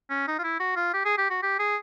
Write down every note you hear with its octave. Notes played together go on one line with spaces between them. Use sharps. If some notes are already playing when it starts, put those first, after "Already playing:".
C#4
D#4
F4
E4
F#4
F4
G4
G#4
G4
F#4
G4
G#4